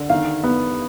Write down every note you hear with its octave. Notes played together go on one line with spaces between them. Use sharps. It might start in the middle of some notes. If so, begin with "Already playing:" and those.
Already playing: D3
D#3 F5
B3